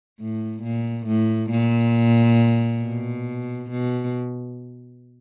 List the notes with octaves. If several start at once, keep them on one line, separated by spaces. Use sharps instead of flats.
A2
A#2
A2
A#2
B2
B2